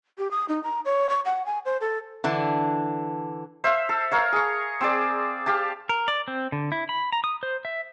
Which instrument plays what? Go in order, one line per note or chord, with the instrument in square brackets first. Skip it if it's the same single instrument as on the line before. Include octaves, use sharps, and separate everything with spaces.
[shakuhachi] G4
D#6
D#4
A#5
C#5
C#6
F#5
G#5
C5
A4
[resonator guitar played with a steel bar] D3 E3 D4
[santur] C5 E5 F5
A4
A#4 C#5 F5
G#4 C#6
C4 G#4 D5
G4 F5 A5
[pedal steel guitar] A#4
D5
C4
D3
E4
B5
A#5
D#6
C5
E5